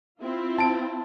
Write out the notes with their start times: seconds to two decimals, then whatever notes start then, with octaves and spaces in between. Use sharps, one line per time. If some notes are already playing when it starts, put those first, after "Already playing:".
0.20 C4 E4 F4
0.58 A5 D7